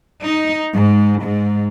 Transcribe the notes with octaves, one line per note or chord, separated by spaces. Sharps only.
D#4
G#2
G#2